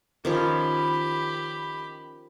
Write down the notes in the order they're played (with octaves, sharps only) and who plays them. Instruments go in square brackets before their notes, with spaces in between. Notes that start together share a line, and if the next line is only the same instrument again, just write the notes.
[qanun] D#3 F3 C#4 [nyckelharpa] G4 B5